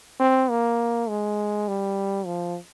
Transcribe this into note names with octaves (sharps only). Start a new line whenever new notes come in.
C4
A#3
G#3
G3
F3